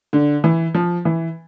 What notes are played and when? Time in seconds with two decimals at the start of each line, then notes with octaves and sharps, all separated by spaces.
0.13 D3
0.44 E3
0.74 F3
1.05 E3